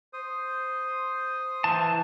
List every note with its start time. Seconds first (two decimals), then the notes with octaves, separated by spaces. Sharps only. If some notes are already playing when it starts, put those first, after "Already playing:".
0.13 C5 D#6
1.64 E3 A5